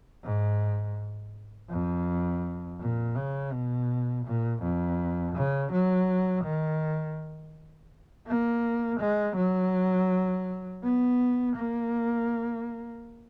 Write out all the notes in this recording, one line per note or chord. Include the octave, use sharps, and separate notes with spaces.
G#2
F2
A#2
C#3
B2
A#2
F2
C#3
F#3
D#3
A#3
G#3
F#3
B3
A#3